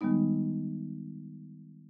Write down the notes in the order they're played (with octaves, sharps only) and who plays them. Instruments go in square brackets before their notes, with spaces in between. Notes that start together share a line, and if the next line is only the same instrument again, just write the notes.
[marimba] D#3 G3 G#3 B3 D#4